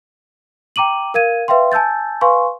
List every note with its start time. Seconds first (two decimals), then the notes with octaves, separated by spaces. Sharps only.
0.76 G5 A#5 D6 D#7 F#7
1.14 A#4 F5 G#6 D#7
1.48 B4 E5 F5 G5 C6
1.72 G#5 A5 E6 G6 A6
2.21 B4 F5 G#5 C6 C#6